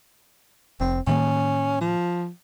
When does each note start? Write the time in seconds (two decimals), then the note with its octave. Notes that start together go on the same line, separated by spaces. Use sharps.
0.80 F1 C4
1.07 A2 D#3 A#3 C#4
1.81 F3